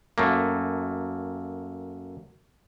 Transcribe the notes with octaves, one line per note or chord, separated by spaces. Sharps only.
F#2 A3 A#3